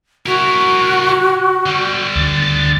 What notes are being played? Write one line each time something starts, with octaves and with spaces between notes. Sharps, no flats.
E4 F#4 A#4
D3 G3
D2 A6